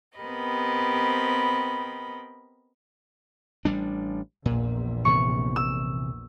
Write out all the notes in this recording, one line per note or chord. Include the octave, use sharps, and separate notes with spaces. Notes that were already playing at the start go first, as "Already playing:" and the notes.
B3 C4 G4 A#4 D#5 B5
A1 G3 D4
A#1 E2 A#2
C3 E3 C#6
E6